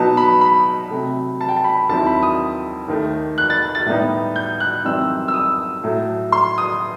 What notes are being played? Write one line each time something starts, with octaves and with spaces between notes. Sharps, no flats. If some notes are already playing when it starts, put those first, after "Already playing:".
Already playing: B2 F#3 B3 D#4 A5
B5
B5
C3 F#3 A3
A5
G5
A5
B5
D#2 D#3 F#3 C4 E4 A5
B5
D#6
D#2 D#3 A3
F#6
A6
A6
A2 G3 B3 D#4
G6
F#6
F#2 E3 G3 C4 D#4 E6
E6
D#6
A2 F#3 A3
C6
D#6